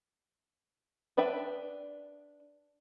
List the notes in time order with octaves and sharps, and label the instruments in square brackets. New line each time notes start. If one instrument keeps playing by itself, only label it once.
[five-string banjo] D4 B4 D5 E5 G5